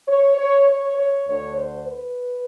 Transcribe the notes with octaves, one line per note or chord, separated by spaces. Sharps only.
C#5
C#5
C#5
C#5
D2 D3 C#5
C5
B4